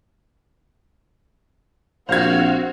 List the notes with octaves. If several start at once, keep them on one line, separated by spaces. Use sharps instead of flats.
A#1 C4 F#4 C5 F5 G#6